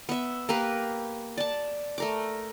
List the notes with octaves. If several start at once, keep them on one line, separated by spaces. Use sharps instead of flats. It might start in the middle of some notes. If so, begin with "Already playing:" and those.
B3 E5
A#3 G4 A#4 B4
D5 A5
A3 A#4 D6